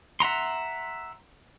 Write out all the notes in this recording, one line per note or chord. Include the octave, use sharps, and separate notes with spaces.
E5 F#5 A#5 C6